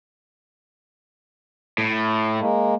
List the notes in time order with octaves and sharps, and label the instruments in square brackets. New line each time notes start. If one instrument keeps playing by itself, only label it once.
[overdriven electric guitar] A2
[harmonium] G#3 A#3